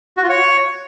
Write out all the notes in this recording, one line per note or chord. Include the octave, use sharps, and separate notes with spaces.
F#4
F4
C#5